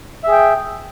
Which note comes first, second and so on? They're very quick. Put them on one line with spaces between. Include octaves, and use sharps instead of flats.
E5 G#4 G5